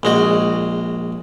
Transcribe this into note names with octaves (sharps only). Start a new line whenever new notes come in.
A#1 G#3 F#4